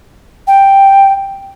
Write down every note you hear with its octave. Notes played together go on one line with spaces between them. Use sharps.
G5